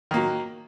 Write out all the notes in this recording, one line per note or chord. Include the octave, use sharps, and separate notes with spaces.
D#3 F#3 A#3